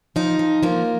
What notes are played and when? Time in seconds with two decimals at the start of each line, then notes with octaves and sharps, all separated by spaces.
0.16 F3 D#4
0.39 F3
0.63 F3 A#3